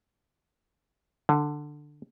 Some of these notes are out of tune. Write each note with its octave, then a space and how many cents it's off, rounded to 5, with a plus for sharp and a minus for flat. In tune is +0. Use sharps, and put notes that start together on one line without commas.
D3 +10